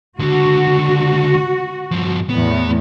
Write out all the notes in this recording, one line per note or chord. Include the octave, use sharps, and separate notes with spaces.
C#2 D3 F#4
G2 F3
E2 A2 B3